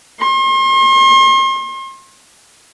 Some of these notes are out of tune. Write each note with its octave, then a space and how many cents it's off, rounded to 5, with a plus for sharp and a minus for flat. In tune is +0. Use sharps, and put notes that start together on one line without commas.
C6 +40